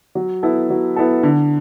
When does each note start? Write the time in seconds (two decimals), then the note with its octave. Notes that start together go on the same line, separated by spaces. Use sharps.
0.15 F#3
0.43 B3 E4 A4
0.70 F#3
0.96 B3 E4 A4
1.23 D3